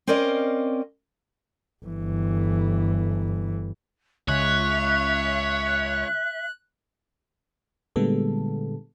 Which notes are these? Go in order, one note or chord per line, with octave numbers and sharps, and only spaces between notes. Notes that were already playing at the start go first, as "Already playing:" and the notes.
C4 C#4 A#4 D5 D#5 F5
G1 E3
C#2 C#5 E5 F#6
A#2 D3 G3 G#3 B3 A4